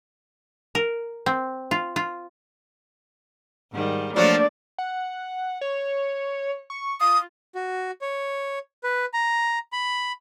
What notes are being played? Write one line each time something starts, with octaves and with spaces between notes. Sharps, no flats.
A#4
C4
F4
F4
G#2 D#3 G3
F3 F#3 A3 A#3 D4 F#4 D5
F#5
C#5
C#6
F4 D#6
F#4
C#5
B4
A#5
B5